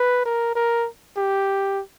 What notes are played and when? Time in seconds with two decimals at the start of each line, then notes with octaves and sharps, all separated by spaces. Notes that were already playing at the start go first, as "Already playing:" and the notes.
Already playing: B4
0.26 A#4
0.56 A#4
1.17 G4